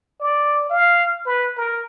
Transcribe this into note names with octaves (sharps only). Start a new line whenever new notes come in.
D5
F5
B4
A#4